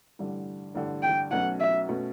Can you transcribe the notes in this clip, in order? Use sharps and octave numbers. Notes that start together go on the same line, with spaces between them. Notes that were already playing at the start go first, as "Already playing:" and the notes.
A1 G2 D3 G3
A1 G2 D3 G3
G5
B1 B2 A3 C#4 F#4 F#5
E5
B2 A3 C#4 F#4